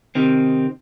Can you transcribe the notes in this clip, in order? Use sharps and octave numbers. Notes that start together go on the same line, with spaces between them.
C3 D#3 C4